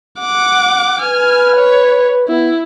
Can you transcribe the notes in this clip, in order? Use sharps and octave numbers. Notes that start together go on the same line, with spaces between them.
F#5 D6
B4 G#5 F6
C#5
B3 E4